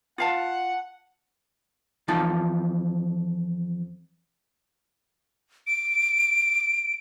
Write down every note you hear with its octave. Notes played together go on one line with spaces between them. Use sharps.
F4 F5 F#5 A5
F2 E3 D#4 F4 A5
D7